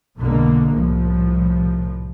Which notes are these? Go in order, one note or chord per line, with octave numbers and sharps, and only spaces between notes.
B1 F#2 B2 D3 G#3 A#3
C2 A2 F3